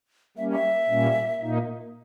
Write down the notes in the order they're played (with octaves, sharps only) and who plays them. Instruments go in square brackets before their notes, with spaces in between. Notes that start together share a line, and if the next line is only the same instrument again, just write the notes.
[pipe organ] G3 A#3 C#4 [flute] E5
[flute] E5
[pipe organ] A#2 G3 A#3 C#4
A#2 A#3 D#4